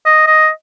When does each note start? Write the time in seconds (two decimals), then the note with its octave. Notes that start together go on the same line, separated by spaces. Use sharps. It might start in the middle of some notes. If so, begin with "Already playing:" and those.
0.05 D#5
0.27 D#5